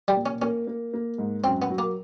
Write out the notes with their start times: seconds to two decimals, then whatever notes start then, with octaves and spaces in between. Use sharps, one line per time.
0.08 G3
0.17 A#2
0.26 C#4
0.42 A#3 C#4
0.67 A#3
0.94 A#3
1.18 G#2
1.44 F#2 C4
1.62 B3
1.70 F#3
1.78 A#3